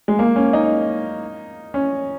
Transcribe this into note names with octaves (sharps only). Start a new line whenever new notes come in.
G#3
A#3
C#4
D#4
C#4